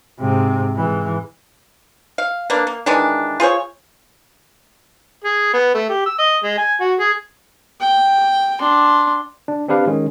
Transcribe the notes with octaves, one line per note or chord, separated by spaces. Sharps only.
G#2 C3
G#2 E3
F5
A#3 B3 D4
A#3
D#3 E3 G#3 D4
F4 G#4 C5 C#5
G#4
B3
A3
G4
E6
D#5
G#3
G#5
F#4
G#4
G5
D4 C6
D4
C4 D4 G4 B4 F5
D#3 G#3 C#4